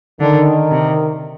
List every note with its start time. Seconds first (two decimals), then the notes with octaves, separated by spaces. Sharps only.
0.20 D3 D#3
0.72 C3